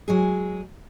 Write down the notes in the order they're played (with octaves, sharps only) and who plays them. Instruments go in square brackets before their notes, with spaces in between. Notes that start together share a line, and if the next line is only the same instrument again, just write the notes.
[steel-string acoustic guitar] F#3 G#3 G#4